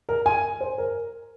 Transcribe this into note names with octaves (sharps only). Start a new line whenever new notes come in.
A#4
G#5
C5
A#4